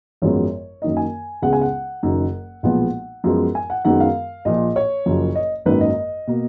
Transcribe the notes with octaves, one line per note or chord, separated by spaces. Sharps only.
G#1 F#2 F3 G#3 B3 C#5
F#2 D#3 A#3 D#5
G#5
C#2 C#3 G#3 B3 F#5
G#5
F#5
F#1 F#2 D#3
B1 A#2 F3 G#3 B3 F#5
F#2 F3 G#3 B3
G#5
F#5
F#2 D#3 G#3 B3 F#5
F5
A#1 A#2 F3 D#5
C#5
F#1 F#2 F3
D#5
G#1 F#2 D#3 A#3 B4
D#5
B2 A#3